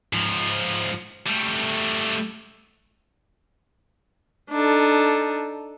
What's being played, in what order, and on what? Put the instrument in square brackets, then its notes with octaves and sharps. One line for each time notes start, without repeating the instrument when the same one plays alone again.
[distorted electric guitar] G#2 F3
G3 A3
[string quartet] D4 D#4 A4